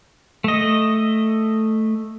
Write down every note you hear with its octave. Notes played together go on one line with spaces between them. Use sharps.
A3 D#5